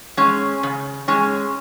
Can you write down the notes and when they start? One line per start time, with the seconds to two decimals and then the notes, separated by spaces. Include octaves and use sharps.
0.17 G#3 C#4
0.63 C#3
1.08 G#3 C#4